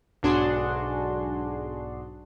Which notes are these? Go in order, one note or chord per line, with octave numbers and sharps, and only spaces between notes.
B1 G#2 D4 F#4 G#4 C6